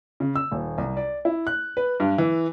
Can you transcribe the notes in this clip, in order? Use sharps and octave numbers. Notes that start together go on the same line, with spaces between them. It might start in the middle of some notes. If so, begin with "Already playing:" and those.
C#3
E6
D#1
C2
D5
E4
F#6
B4
G2
E3